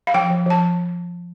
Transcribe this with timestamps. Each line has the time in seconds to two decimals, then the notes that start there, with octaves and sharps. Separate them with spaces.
0.07 F5
0.14 F3 G5
0.30 F3
0.46 F3 A5